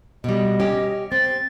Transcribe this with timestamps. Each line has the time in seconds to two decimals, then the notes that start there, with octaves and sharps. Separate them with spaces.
0.24 B2 G3 D#5
0.60 C#4 G4
1.12 C4 A6